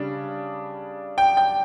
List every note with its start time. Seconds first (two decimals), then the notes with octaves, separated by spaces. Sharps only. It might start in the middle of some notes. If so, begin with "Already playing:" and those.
Already playing: C#3 G3 D4
1.18 G5
1.37 G5